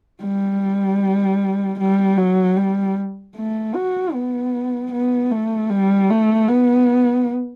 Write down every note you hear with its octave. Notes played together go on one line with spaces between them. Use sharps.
G3
G3
F#3
G3
A3
F#4
B3
B3
A3
G3
A3
B3